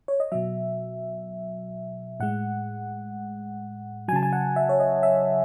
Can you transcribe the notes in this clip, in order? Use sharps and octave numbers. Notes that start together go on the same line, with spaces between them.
C#5
D#5
B2 F#3 E5
A2 G#3 F#5
C#3 F#3 G#5 A5
G#5
F#5
E5
C#5
D#5
E5